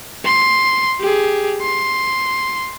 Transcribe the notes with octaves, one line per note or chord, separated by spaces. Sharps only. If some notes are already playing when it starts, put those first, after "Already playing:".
C6
G4 G#4
C6